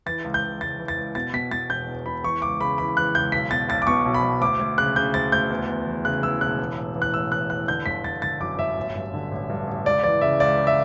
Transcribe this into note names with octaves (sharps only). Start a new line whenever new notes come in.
E3 A6
C#2
G6
C#2
C#2 A6
E3
A6
C#2
B2 A6
B2 B6
B2 A6
E1 G6
E2
E1 B5
E3 C#6
C#2 D6
C#3 B5
E3 B5
E3 F#6
C#2 G6
B1 B6
B2 A6
B1 A6
D6
B2 C#6
B1
B5
B1
D2 D6
D2
C#3 F#6
C#3 G6
D2 A6
D2 G6
E2
E2
E3
C#3 F#6
E3 E6
E1 F#6
E3
A1
E3
F#6
A1 E6
A1 F#6
E3 F#6
D3 G6
G1 B6
G1 A6
G1 A6
F#2 D6
G1 E5
A1
G2
D3
A1
G2
A1
C#2 D5
E3 D5
C#3 E5
C#2 D5
C#3
E5